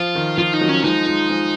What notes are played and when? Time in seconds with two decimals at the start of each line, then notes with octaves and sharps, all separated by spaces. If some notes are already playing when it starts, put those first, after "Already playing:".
Already playing: F3 F4
0.15 D#3
0.38 F3 F4
0.54 D#4
0.61 D#3 F#3
0.69 C#4
0.84 F3 G#3 D#4
1.06 F3 G#3
1.29 F3 G#3